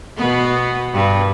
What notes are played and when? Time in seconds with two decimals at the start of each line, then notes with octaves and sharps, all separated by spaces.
0.17 B2 B3
0.94 G2